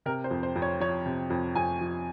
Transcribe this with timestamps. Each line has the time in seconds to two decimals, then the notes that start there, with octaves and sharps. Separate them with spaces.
0.06 C3 A#4
0.24 C5
0.31 F2
0.43 C5
0.56 F2
0.62 C#5
0.80 F3 C#5
1.06 C3
1.30 F2
1.55 F2 G#5
1.81 F3